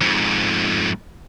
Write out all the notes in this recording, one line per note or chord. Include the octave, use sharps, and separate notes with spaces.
F2 G#2